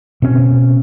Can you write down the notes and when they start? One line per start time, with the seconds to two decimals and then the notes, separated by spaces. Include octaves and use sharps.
0.22 B2 C4 C#4